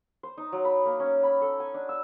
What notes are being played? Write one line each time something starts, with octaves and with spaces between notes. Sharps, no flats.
C5
D#4
F#3
B5
A#3
C#4
B5
A4
G#5
D4
E6